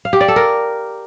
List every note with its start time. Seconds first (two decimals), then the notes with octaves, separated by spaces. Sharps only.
0.05 F5
0.13 G4
0.21 D5
0.28 A4
0.36 A#4